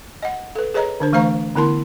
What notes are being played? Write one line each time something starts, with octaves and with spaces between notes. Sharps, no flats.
D#5 F#5
A4 B4
G#4 B4 C#5 D#5 A#5
D3 D4 C5
E3 A3 C5 F5 A#5 C#6
D3 B3 E4 A#4 A5 C6